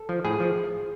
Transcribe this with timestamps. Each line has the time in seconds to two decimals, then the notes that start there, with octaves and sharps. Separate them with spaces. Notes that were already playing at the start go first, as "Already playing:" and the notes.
Already playing: A4
0.09 F3
0.25 A2 G#4
0.40 F3